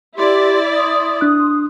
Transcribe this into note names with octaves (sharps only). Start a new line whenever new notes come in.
E4 G4 D5 C6
C6 D#6
D4 F#6